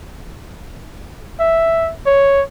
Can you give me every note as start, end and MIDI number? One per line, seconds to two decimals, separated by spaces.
1.40 1.92 76
2.06 2.42 73